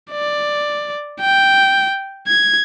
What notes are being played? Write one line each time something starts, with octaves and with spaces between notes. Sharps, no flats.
D5
G5
G#6